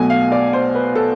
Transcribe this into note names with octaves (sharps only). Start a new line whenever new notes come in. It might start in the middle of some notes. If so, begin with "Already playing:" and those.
Already playing: B1 B2 A3 G#5
F5
D5
C5
B4
A4